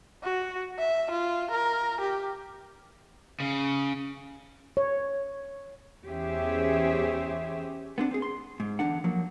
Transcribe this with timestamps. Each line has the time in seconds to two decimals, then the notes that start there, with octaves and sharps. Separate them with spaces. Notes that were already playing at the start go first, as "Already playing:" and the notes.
0.23 F#4
0.79 E5
1.11 F4
1.51 A#4
2.00 G4
3.40 C#3
4.77 C#5
6.05 E2 C#4 G4 G#4 C5 E5
7.98 B3 C4 D4
8.11 C4 G#4
8.22 C6
8.60 G#2
8.79 E2 D3 D4 F#5
9.04 F3 F#3 A#3